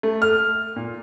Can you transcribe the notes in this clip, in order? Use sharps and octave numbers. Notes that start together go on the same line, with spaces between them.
A3
F6
A#2